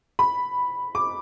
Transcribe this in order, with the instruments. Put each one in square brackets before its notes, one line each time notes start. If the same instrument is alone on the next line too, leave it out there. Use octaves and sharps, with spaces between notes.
[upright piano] B5
D6